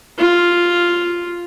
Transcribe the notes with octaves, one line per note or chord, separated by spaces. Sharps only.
F4